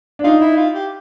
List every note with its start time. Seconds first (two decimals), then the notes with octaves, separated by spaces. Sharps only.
0.19 D4
0.24 D#4 F4
0.41 E4
0.57 F4
0.75 G4